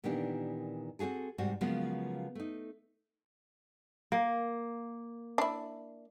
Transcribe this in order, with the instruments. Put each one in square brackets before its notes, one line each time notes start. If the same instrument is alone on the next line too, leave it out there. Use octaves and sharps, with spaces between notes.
[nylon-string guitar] A#2 D#3 E3 B3 D4 G4
C4 C#4 F#4 G#4 A4
G#2 C3 G3 F#4
C#3 F3 F#3 G#3 A#3 B3
A3 D#4
[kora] A#3
[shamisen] D4 E4